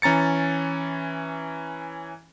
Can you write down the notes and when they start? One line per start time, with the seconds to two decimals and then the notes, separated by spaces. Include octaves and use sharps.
0.02 E3 C#4 A#5 A6 C#7